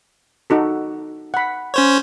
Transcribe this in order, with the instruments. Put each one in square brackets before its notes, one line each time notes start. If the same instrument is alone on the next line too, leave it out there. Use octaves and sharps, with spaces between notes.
[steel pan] D#4 F#4 A4
F#5 B5
[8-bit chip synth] C#4 C5 C#5